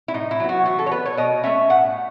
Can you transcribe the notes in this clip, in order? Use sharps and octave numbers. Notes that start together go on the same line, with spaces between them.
E4
A2 D#4
E4
F#3 B3
F#4
E3 F#4
A4
C#5
B3 B4
C#5
B2 D#5
A3 C#4 E5
A2 F#5